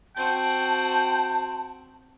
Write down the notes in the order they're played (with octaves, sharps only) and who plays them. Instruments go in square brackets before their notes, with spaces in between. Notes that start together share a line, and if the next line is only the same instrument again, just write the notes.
[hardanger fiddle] C4 F#4 [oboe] G5 [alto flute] A5